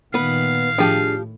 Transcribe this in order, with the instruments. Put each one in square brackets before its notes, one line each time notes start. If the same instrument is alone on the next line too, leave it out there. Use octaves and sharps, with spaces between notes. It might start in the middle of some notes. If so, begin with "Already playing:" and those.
[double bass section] A#2 D#3 [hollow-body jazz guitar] B3 B4 [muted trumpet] F5
[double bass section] A2 [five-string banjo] F3 G4 [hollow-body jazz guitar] D4 G#4